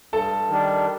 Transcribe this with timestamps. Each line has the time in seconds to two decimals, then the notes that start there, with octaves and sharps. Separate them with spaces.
0.13 G2 A4 A5
0.49 D#3 G3 D4